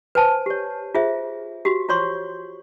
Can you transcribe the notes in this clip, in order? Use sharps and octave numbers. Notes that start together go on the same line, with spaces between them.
B4 C5 G#5 A5
G4 C#5
F4 G#4 C5 E5
F#4 G4
F4 C5 C#5 C6 C#6